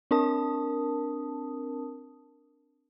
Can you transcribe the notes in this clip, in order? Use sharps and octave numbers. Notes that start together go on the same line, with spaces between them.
C4 D4 A#4 A5 D#6